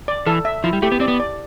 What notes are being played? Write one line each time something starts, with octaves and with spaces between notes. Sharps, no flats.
D5
E3 A4
E5
F3 E4
G3
A3 G4
B3
C4 D5
B3
D5